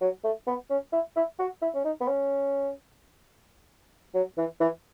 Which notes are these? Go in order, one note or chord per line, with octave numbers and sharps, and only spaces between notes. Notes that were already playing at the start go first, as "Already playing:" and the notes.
F#3
A3
B3
C#4
E4
E4
F#4
E4
C#4
D#4
B3
C#4
F#3
E3
E3